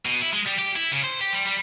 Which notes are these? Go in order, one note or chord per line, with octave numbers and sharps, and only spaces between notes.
B2
E4
G#3
G3
G4
E4
C#3
C5
G4
G3
G3